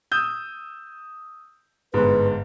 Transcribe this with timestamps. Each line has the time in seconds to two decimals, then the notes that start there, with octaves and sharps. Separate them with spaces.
0.12 D#6 E6 G6
1.94 G1 G#2 B4